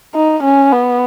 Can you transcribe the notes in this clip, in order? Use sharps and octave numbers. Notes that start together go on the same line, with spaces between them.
D#4
C#4
B3